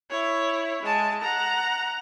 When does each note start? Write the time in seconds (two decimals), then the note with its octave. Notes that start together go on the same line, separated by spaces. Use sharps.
0.11 E4 C#5
0.83 G#3 A5
1.23 F#5 A#5